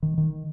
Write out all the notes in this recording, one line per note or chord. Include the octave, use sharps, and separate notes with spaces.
D#3
D#3